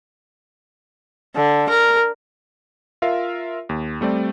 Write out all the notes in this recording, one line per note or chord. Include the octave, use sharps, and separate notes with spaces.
D3
A#4
F4 A#4 E5 F5
D#2
G3 A3 C4 D5